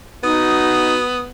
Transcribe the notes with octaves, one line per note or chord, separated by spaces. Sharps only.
B3 D#4 F#4 D#6